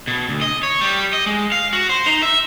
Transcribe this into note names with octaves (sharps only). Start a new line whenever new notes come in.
B2
D2
D#5
C#5
G3
D#5
G#3
F5
F#4
C5
D#4
E5